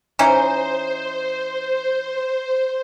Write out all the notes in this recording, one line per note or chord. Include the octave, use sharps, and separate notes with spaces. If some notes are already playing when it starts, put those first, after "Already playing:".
E3 C#4 D#4 C5